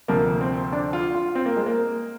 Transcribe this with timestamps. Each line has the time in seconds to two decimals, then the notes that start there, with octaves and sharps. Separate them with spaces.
0.08 D2 C3 F3 A#3
0.41 C4
0.73 D4
0.93 F4
1.15 F4
1.35 C4
1.46 A#3
1.57 G#3
1.66 A#3